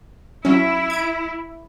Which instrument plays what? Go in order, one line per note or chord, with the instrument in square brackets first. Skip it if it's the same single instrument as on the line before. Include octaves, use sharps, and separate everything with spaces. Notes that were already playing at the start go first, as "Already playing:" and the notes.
[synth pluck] F#3 C#4 [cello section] E4
[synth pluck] G#6 D7